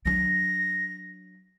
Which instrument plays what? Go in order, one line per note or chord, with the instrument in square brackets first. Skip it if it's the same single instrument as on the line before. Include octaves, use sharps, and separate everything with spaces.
[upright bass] F#3 D4 [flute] A#6